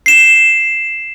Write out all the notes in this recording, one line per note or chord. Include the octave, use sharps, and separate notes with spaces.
C7 E7